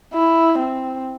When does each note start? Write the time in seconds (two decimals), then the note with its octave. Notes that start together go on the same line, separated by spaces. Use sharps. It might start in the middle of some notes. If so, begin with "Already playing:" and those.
0.14 E4
0.59 C4